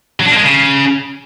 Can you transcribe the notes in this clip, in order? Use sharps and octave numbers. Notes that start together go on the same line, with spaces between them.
F#3
D4
A#3
G#3
C#3